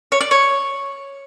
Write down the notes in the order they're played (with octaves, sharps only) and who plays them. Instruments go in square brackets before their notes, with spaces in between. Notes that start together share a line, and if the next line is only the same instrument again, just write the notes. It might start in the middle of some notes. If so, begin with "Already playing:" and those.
[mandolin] C#5
D5
C#5